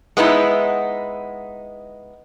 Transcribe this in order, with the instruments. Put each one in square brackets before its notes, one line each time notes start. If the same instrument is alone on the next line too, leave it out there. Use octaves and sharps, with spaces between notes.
[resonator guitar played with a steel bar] G#3 B3 D#4 E4